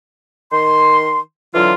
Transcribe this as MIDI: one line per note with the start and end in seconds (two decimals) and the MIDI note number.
0.52 1.19 51
0.52 1.19 84
1.54 1.73 50
1.54 1.73 52
1.54 1.73 54
1.54 1.73 65